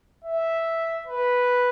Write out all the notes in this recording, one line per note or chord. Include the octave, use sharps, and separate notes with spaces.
E5
B4